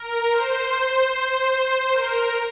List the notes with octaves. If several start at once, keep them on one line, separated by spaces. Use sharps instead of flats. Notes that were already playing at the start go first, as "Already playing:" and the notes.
Already playing: A#4
C5
A#4